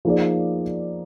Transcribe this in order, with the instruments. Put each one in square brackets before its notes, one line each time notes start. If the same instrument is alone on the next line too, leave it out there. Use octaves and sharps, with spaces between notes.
[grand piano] F3 A#3 D#4 G#4 D5